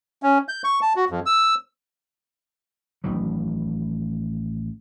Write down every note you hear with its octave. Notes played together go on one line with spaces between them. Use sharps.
C#4
G6
C#6
A5
F#4
F2
E6
A1 D#3 E3 F#3